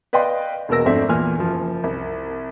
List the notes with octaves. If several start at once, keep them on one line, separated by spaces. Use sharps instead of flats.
B4 D5 D#5 F5 G5 C6
E1 B2 A#3 A#4 E6 A#6
G#1 F2 A3 C4 D4 E5
E2 A#2 G#5 F6
F#1 F3
C2